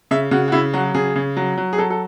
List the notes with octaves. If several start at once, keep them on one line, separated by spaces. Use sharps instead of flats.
C#3 E5
C#3 F#4
F#4
C#3 E4
F#3 F#4
C#3 G#4
C#3
F#3
F#3
G#4
F#3 A4
A4